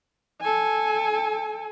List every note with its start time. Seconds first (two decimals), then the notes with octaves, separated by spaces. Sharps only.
0.41 A4 G#5